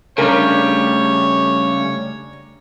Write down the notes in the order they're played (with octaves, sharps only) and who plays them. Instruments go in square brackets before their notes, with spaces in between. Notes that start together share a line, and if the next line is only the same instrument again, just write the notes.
[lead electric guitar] C#3 G3 [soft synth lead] A3 [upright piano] D4 A#4 [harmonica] C#5